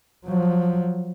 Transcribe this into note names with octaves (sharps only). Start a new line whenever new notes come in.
F3 F#3